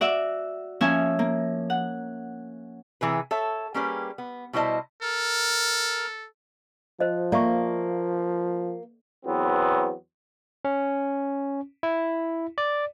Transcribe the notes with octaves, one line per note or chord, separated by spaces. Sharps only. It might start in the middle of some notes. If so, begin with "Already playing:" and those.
F#4 D5 E5 E6
F3 A#3 C#4 E5 G#5
A#3
F#5
C3 E3 G#4 B4
A4 C#5 E5
G3 A#3 C#4 G4 G#4 B4
B3
B2 G3 E4 C5 D#5 A5
A4 A#4
F3 C5 D#5
A#3 D5 E5 C#6
E2 F#3 B3 C4
C#4
E4
D5